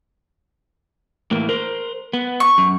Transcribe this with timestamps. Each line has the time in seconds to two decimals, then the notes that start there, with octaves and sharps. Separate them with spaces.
1.31 A2 E3 A#3
1.49 A#4 C5
2.13 B3
2.40 C#6
2.58 F#2